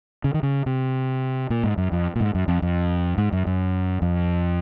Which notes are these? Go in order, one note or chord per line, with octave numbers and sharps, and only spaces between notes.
C#3
D#3
C#3
C3
A#2
G#2
F#2
F2
A#2
G#2
F#2
F2
F2
G#2
F#2
F#2
F2